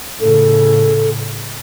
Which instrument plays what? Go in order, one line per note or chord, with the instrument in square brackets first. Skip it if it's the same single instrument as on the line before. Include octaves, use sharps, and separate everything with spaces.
[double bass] A2 C#3 [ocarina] A4